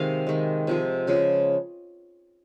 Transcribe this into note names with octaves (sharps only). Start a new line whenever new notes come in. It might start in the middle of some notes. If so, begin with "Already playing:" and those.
Already playing: C3 D#3 G#3 F5
D#3 G#3
C3 F3 G#3
C#3 F3 G#3